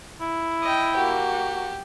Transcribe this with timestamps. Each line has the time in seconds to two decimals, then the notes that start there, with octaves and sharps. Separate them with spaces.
0.21 E4
0.62 D#5 G5
0.96 A#3 F#4 G4